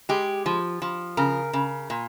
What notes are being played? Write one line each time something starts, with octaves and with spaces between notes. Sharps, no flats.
G#3 G4
F3
F3
C#3 A#4
C#3
A#2